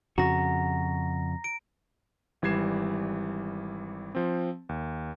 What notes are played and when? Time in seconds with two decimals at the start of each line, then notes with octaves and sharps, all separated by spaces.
0.18 F2 C#3 F#4 A#5 A#6
1.44 D7
2.42 G#1 E3 G3 G#6 C7 E7
4.15 F3 C4
4.69 D#2